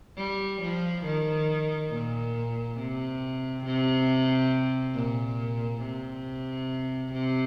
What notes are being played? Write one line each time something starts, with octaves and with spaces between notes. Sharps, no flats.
G3
F3
D#3
A#2
C3
C3
A#2
C3
C3